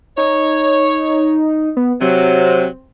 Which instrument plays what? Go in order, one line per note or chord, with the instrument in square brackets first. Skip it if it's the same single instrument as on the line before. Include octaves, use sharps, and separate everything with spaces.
[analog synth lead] D#4 [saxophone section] C#5
[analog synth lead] B3
[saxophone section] C3 F#3 [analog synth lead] C4